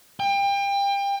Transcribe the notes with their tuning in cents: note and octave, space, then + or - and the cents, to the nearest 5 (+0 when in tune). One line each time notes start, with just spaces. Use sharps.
G5 +30